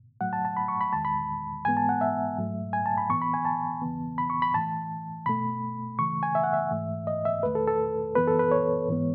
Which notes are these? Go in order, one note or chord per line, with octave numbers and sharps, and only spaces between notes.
A2 F#3 A3 F#5
A5
A5
B5
C#6
B5
E2 D#3 G#3 A5
B5
G#2 E3 G#3 B3 G#5
A5
F#5
E5
G#2 F#3 A3
G#5
A5
B5
A2 E3 B3 C#6
B5
G#5
A5
E2 C#3 E3 B3
B5
C#6
B5
A2 E3 A3 A5
B2 A3 B5
C#3 E3 A3 C#6
G#5
E5
F#5
E5
G#2 E3 A3
D#5
E5
E2 D#3 A3 B4
A4
A4
F#2 E3 B3 B4
A4
B4
C#5
G#2 E3 G#3 B3